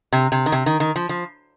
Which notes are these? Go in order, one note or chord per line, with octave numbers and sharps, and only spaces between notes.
C3
C3
D#3
C3
D#3
D#3
F3
F3